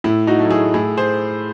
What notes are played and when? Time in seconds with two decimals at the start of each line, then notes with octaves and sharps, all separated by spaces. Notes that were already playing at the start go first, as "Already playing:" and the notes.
0.04 A2 E4
0.27 D#4 F#4
0.39 F#3 A3
0.50 E4 G#4
0.74 A2 E4 G#4
0.97 G#4 C5